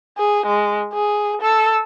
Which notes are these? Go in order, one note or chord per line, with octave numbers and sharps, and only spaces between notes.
G#4
G#3
G#4
A4 E6